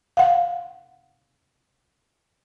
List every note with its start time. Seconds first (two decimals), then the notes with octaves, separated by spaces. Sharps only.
0.17 F5 F#5